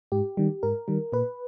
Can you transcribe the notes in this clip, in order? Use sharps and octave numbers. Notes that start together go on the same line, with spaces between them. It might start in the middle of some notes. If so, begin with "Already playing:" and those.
G#2 G4
D#3 G3
G#2 A#4
D#3 G3
A#2 B4